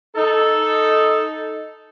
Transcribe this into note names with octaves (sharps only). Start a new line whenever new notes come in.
D#4 A4